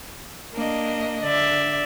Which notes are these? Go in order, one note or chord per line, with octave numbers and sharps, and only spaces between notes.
A#3 D4 D#5
D3 D5 E5